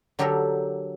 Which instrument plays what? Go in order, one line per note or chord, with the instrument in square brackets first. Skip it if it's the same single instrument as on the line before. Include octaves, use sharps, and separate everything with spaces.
[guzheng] D3 F#3 G4 A4 A#4